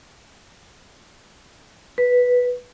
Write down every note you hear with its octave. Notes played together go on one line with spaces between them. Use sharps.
B4